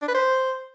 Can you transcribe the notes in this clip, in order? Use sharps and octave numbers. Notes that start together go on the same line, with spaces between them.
D4
B4
C5